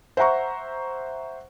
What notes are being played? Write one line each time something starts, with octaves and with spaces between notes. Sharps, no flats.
C5 E5 F#5 A#5 C#6